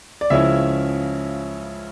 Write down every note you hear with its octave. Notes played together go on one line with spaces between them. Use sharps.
D5
C#2 C#3 F3 C#4 E4 E5